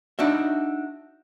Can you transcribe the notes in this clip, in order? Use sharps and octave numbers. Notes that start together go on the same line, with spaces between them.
D4 D#4 F#4 E5